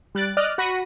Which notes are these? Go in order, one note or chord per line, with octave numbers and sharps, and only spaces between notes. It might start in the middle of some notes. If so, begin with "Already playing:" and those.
G3 F#6 A6 D7
D5 D#5 F6 F#6
F#4 F#5 B5 A#6 D#7